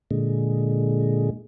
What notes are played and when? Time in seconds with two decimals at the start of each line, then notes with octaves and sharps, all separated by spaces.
0.11 A#2 D3 G#3